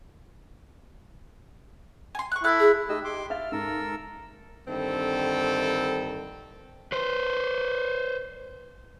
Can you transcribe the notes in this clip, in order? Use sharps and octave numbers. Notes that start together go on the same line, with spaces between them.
G#5 C6
C#6 F#6
E4 A4 F#6
G#4
A3 D#4 G4 D#5 E6
C6 D6
E5 F5 F6 A6
G#2 A4 A#4 E6
G2 D3 D#3 C4 A4
B4 C5